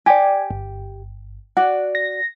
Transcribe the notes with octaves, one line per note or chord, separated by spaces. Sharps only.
G4 D5 G#5
G1
F#4 D5 F#5
A#6